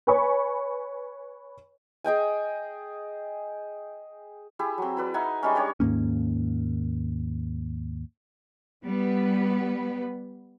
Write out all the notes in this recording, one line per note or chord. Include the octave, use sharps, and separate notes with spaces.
B4 C#5 G#5 B5 C#6
G#4 D#5 G5 G#5
E4 G4 G#4
F#3 C4
E4 B4 D5
D#4 E5 F#5 G#5
G3 G#3 C#4
D4 G4 C#5 D5
D#2 G#2 A#3 C#4
G3 B3 B4